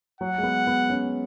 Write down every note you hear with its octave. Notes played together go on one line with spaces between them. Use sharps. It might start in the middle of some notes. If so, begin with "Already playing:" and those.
F#3 F#5
G#3
B3
B3
C#4